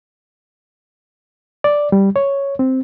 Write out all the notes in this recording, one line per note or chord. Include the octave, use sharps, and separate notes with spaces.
D5
G3
C#5
C4